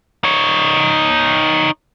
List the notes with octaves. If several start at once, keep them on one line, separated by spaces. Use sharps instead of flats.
D#4 C#5